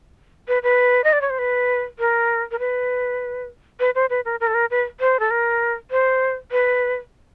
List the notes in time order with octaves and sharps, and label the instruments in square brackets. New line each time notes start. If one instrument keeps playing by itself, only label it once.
[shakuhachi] B4
B4
D#5
D5
C#5
C5
B4
A#4
A#4
B4
B4
C5
B4
A#4
A#4
A4
A#4
B4
C5
A4
A#4
C5
B4